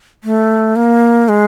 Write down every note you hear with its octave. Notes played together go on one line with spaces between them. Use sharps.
A3
A#3
G#3